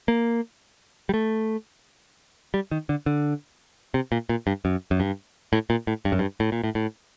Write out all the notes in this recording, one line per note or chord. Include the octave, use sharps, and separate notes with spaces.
A#3
G3
A3
G3
D#3
D3
D3
C3
A#2
A#2
G2
F#2
F#2
G2
A2
A#2
A2
G2
F#2
G2
A2
A#2
A2
A2